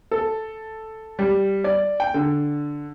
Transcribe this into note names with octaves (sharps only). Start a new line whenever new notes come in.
A4
G3
D5
G5
D3